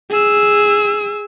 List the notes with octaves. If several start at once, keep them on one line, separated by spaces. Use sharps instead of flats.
G#4 E6